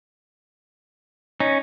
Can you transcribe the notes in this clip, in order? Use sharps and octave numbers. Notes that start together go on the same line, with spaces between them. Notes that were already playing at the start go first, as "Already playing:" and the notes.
C#4 D#4